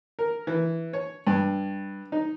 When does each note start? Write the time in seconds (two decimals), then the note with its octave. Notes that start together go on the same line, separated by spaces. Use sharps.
0.19 A#4
0.47 E3
0.93 C#5
1.27 G2
2.12 D#4